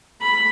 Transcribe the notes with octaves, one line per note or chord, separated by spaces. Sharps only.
B5